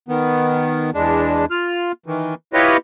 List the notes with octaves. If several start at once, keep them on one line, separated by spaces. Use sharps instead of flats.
D#3 B3
E2 G#3 D4
F4 F6
D#3 E3
E4 F4 G4 B4 C#5 D#5